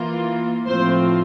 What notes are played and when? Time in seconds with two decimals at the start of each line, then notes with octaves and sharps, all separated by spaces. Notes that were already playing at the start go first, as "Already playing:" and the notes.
Already playing: E3 A#3 F4
0.67 A2 F3 C4 F4 C5